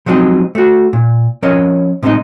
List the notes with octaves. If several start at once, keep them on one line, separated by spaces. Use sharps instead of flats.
F3 F#3 G#3 C4 D#4 G4
A3 F#4
A#2
F3 C#4 A#4 C#5 D#5
A2 C3 G#3 A3 D#4 D#5